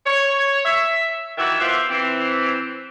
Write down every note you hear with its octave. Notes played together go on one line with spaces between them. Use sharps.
C#5
E5
D#3 E3 F#4 E5
B3 F4 G4 C5 E5
E3 C4